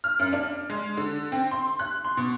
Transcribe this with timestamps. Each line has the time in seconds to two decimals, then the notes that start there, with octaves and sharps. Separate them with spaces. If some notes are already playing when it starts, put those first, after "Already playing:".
0.04 F6
0.19 F#2
0.33 D4
0.70 G#3
0.97 D3
1.32 C4
1.51 C6
1.79 F#6
2.05 C6
2.17 B2